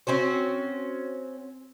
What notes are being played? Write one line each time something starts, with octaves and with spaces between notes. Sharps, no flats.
C4 C#4 F#4 C5